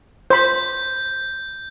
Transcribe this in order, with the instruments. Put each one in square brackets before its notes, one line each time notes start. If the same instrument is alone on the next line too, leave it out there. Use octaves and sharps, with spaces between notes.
[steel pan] C5 B5 [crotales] G6